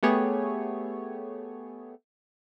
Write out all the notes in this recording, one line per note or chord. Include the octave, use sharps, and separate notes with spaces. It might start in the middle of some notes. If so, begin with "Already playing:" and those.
A3 B3 G4 G#4 C#5